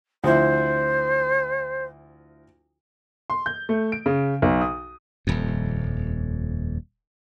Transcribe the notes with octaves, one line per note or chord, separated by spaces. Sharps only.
D2 F3 E4 C5
C6
G6
A3
D7
C#3
B1
D#6
D#1 F2